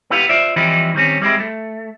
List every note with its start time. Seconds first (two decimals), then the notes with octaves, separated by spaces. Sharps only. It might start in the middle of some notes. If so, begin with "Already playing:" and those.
0.10 B3 E4 G4 F5
0.29 F4 C5 D5 E5
0.56 E3 F3 G3 C4 D#4 E4
0.95 D#3 G3 C4 C#4
1.22 G3 G#3 C4 E4
1.40 A3